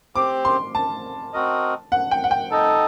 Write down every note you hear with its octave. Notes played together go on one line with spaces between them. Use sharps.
C4 G4 C5 D6
C6
A5
C4 F#4 A#4 D#5
F#5
G5
F#5
G5
D#4 A4 D#5